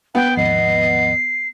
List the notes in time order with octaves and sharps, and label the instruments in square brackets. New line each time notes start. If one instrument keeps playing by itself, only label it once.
[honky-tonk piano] B3 [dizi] B4 [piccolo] G5
[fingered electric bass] D#2 G#2 F3 [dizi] D#5 [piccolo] C7